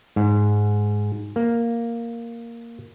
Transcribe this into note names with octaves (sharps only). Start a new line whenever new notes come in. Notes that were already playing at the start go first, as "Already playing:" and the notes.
G#2
A#3